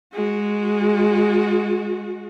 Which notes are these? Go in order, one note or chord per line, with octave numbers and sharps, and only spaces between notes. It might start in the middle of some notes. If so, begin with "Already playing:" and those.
G#3 F#4